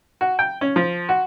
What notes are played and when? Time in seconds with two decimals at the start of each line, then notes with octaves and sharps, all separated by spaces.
0.21 F#4
0.39 G5
0.61 C#4
0.76 F3
1.09 F#4